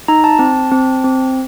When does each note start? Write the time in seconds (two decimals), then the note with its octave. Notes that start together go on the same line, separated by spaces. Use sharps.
0.08 D#4 A#5
0.24 A5
0.39 C4
0.72 C4
1.04 C4